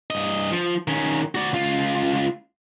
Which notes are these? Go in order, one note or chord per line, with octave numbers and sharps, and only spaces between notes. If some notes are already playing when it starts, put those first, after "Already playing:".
G2 D#5
F3
D#3 C#4
F#4 D5
C#2 F4